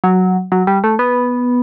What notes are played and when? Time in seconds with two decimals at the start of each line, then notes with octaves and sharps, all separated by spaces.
0.04 F#3
0.52 F#3
0.67 G3
0.84 A3
0.99 B3